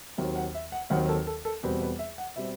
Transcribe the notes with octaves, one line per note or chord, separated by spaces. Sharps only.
D#2 D#3 F#3 C4
F#5
E5
F#5
D#2 D#3 F#3 C4 F#5
A4
A4
A4
E2 B2 G3 C4 B4
B4
E5
F#5
B2 G3 C4 E5